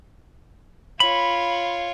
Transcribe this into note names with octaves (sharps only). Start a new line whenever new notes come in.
F4 C#5 B5